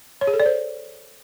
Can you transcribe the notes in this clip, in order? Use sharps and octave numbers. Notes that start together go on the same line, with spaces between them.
C#5
G#4
A4
D5
C5